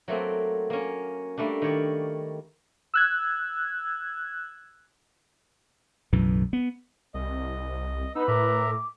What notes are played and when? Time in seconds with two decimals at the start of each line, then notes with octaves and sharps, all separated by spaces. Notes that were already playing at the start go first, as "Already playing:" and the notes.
0.08 F#3 A3 A#3 C4
0.70 A#3 C#4
1.37 G3 A3 A#3 D4
1.62 D#3 C#5 D5
2.94 E6 F#6 G#6
6.13 B1 F#2 A2 E3
6.53 B3
7.14 C2 D#5
8.15 B3 D#4 B4 E6
8.28 A2 A#4 E5 A#5 D6